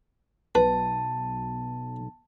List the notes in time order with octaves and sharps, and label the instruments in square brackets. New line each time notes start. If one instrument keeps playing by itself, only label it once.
[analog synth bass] B1 [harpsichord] B4 [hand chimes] A5